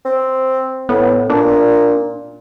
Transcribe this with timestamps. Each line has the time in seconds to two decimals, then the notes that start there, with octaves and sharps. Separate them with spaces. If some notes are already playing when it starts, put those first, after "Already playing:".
0.05 C4
0.89 A2 B3
1.30 A#2 D4